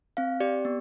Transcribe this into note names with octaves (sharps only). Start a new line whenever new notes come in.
C4 F5
G4 D5
B3